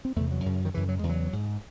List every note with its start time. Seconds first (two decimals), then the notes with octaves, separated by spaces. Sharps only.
0.05 C4
0.16 E2 C3 A3
0.31 F#3
0.46 F#2 C#3
0.65 D#3
0.74 F#2 C#3 E3
0.89 F#3
0.99 E2 C#3 G#3
1.09 F#3
1.33 G#2